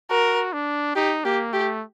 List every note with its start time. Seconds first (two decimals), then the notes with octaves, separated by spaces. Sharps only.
0.10 F#4 A#4
0.53 D4
0.95 D#4 G4
1.25 A#3 G4
1.53 A3 G4